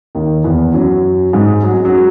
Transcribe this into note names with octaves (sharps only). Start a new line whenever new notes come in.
D#2 D#3
E2 E3
F#2 F#3
G#2 G#3
F#3
G#3
F#2 F#3